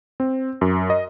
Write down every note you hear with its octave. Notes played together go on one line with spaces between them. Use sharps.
C4
F#2
D#5